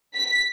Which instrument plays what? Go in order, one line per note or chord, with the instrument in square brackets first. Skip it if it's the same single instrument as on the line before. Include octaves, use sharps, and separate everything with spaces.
[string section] B6